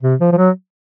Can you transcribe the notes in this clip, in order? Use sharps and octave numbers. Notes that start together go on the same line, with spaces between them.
C3
F3
F3
F#3